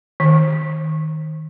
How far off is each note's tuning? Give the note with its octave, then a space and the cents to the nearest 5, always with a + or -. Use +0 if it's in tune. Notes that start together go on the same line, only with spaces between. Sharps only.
D#3 +10